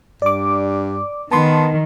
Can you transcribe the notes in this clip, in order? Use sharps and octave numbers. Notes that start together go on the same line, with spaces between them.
G2 D5 D6
D#3 B3 A5 C6